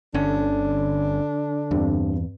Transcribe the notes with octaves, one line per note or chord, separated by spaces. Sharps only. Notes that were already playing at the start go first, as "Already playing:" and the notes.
G1 D3 C#4 D4
E2 G2 C4